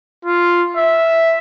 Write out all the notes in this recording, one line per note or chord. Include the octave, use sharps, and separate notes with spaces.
F4
E5